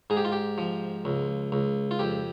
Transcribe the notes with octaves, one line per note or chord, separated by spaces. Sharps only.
G#2 G#4
G4
F4
G4
F3
C#2
C#2
F4
F2 G4